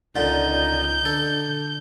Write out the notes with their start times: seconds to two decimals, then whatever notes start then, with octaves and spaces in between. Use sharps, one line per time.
0.16 C#2 A#2 D3 D#4 G6
1.05 D3 A4